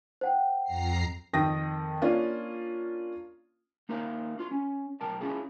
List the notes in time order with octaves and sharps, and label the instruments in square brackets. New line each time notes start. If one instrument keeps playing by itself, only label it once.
[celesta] C5 F#5 G5
[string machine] F2 A#5 C7
[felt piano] F2 D#3 G5 D#6 A#6
A#3 C#4 D4 F4
[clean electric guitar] A#3 D#4 A#4 C5 E5 F5
D4 F4 C6
C#4
B1 A#4 G5 A5
C#4 E4 F4 G#4 A4